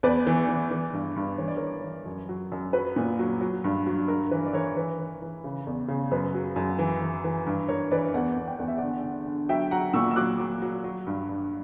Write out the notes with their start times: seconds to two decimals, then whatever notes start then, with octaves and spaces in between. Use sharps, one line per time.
0.03 E2 B4 D5
0.27 E3
0.48 E3
0.71 E3
0.93 G2
1.16 G2
1.38 E3 C#5
1.48 D5
1.57 E3 A#4 C#5
1.84 E3
2.06 F#2
2.29 F#3
2.52 F#2
2.73 F#3 B4
2.96 A#2
3.19 F#3
3.41 F#3
3.64 G2
3.87 F#3
4.08 G2 A#4
4.31 E3 B4
4.46 D5
4.53 E3 A#4 C#5
4.76 E3 B4
4.99 E3
5.22 E3
5.44 C#3
5.67 E2
5.88 C#3
6.11 F#2 B4
6.34 F#3
6.56 F#2
6.79 E3
7.02 E3
7.24 E3
7.47 G2
7.68 G2 A#4 C#5
7.91 E3 B4 D5
8.14 E2 D5 F#5
8.37 E2
8.48 G5
8.58 E2 F#5
8.68 E5
8.78 D3 D5 F#5
9.03 D3
9.26 D3
9.49 F#3 E5 G5
9.71 F#3 F#5 A#5
9.94 A#2 C#6 E6
10.11 E6
10.16 F#3 D6 F#6
10.39 F#3
10.62 F#3
10.84 F#3
11.07 G2
11.29 G2